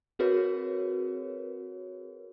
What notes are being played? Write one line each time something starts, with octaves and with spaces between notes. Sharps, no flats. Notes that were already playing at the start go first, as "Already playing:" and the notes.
C4 F#4 G#4 A#4 B4 C#5